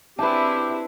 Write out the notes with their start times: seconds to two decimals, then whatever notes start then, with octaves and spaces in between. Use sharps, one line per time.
0.19 C4 D4 E4 G4 B4 A5